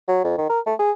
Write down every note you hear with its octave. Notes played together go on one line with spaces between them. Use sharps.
F#3
F2
D#3
A#4
A3
G#4